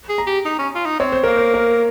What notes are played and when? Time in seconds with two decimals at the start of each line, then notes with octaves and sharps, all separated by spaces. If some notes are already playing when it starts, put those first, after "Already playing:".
0.09 G#4
0.18 A#5
0.27 G4
0.45 D#4
0.59 C#4
0.75 F4
0.86 D#4
1.00 C4 C#5
1.12 C5
1.24 A#3 A#4
1.37 C5
1.54 A#4